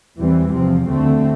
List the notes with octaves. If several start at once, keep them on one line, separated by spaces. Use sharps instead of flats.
E2 E3 G3 C4
E2 C3 F3 C4
D2 D3 A3 C4